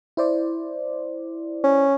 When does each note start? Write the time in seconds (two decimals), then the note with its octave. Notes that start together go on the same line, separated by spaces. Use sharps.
0.17 E4 C5 D5
1.64 C#4